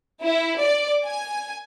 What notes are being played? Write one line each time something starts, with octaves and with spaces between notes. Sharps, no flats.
E4
D5
G#5